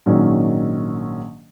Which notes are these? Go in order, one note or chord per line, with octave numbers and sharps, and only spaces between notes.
A#1 G#2 D#3 F#3 C#4